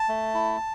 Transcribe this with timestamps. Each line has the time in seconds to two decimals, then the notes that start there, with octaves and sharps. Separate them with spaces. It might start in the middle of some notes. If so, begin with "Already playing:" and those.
Already playing: A5
0.09 A3
0.34 E4